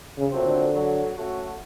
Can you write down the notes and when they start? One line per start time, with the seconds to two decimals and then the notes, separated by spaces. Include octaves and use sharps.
0.18 C#3
0.32 A#2 F#3 A3 C4
0.46 D3
0.75 F#3
1.16 A3 C#4 F#4